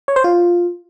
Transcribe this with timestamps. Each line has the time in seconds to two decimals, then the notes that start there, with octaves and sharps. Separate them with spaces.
0.08 C#5
0.16 C5
0.24 F4